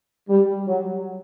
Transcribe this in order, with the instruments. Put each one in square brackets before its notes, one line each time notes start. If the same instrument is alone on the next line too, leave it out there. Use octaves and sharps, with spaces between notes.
[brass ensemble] G3
F#3